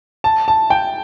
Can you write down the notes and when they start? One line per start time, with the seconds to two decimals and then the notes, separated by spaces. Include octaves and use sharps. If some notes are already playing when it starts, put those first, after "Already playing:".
0.24 A5
0.48 A5
0.70 G5